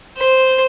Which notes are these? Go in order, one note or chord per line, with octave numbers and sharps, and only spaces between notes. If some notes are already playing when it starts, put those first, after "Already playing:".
C5